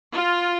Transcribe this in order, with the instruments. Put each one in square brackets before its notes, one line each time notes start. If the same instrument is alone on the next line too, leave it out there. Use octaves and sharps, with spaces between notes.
[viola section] F4